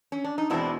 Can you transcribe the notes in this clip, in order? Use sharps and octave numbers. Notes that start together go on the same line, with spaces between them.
C#4
D4
D#4
E2 B2 G#3 C4 D4 E4